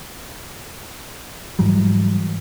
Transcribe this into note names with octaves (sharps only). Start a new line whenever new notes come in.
G#2 E3 F#3 G3